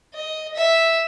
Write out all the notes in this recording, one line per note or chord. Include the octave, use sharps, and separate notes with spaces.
D#5
E5